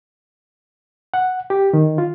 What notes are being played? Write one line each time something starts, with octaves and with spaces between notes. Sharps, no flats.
F#5
G4
D#3
F4